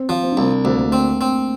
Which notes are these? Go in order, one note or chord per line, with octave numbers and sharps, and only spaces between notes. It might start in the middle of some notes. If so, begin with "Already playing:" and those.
Already playing: C4
F3
C4
D4
C2 C4
D2 C4
A#3
A3
C4
A#3
C4